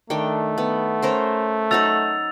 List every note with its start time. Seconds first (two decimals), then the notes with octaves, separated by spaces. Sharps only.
0.10 D#3 A3 D4 G5
0.58 B3
1.02 C#4 A#4 C5
1.71 F#3 D#4 F#4 E6 A6 F7